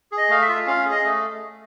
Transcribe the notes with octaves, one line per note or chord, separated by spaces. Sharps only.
G#4
D#5
A3 F5
E5
F4
C#4 F5
G#4
D#5
A3